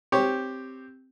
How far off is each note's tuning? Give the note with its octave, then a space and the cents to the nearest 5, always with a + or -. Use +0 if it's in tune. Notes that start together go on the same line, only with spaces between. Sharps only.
C4 -5 G4 +0 C#5 +0